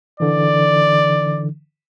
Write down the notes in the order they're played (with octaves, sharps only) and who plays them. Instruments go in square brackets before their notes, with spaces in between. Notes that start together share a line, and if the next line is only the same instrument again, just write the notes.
[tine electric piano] D3 E3 [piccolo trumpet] D5